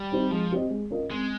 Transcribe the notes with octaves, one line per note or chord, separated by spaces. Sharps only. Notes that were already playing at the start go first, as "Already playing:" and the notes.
Already playing: G3
C4 D#4 G4 C5
F3 G#3
C4 G4 C5 D#5
G#3
C#4 F4 A#4 D#5
G#3 C4